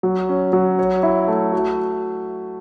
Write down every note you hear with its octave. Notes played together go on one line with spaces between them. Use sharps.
F#3
C#4
F#3
C#5
E4
A3
F#4